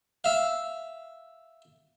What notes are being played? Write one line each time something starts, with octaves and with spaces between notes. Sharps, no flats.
E5 F5